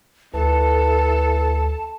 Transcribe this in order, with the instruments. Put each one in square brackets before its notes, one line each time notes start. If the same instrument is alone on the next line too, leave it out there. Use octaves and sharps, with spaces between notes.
[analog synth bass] D2 [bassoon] E3 [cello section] A4 [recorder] A5